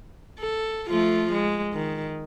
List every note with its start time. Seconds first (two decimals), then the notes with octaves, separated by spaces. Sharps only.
0.39 A4
0.89 F3 A3 F4
1.32 G#3
1.73 D#3